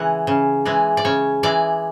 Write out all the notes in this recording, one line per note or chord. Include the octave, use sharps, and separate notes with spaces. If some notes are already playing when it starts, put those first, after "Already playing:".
Already playing: C#3 E3 G#3 F#5
C#3
E3 G#3 D5
D5
C#3 C#5
E3 G#3 D5